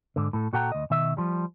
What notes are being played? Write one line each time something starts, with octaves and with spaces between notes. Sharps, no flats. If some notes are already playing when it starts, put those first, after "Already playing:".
G#2 D3
A2 A4
A#2 F#4 A4 F#5 G5 A#5
D2 D#5
B2 D#3 E5
F3 G3